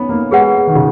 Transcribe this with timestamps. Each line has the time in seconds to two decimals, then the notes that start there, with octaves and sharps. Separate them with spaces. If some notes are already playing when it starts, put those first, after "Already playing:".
Already playing: B3 C#4
0.09 A#3
0.31 G#3 G#4 B4 F#5
0.67 D#3
0.75 C#3